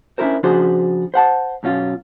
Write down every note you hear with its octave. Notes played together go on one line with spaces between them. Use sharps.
C#4 D4 E4 G4 A#4 C5
C#3 F3 D4 F#4 G#4 C5
C5 F#5 A5
F#2 B2 C#4 F4